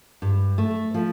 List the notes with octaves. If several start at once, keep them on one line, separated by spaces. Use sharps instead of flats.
G2
A3
F3